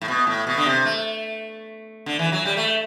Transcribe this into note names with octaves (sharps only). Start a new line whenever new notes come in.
A2
B2
A2
B2
D3
C3
A3
D3
E3
F#3
G3
A3